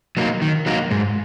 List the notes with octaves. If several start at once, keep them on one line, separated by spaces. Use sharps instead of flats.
F#3 A#3 D#4
D#3
F#3 A#3 D#4
G#2